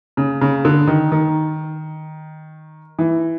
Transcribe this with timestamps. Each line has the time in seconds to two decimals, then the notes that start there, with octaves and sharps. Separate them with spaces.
0.17 C#3
0.41 C#3
0.65 D3
0.87 D#3
1.12 D#3
2.99 E3